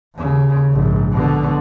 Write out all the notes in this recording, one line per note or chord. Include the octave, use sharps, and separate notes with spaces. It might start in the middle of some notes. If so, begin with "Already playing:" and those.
D#2 C#3
A#1 G#2
B2 D3